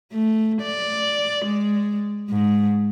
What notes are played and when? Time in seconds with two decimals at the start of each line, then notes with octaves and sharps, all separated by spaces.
0.12 A3
0.62 D5
1.45 G#3
2.30 G#2